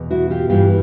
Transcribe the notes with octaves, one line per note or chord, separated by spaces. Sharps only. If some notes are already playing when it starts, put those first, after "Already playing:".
Already playing: E2 B2
E4 F#4
F4 G4
G2 E3 F4 G4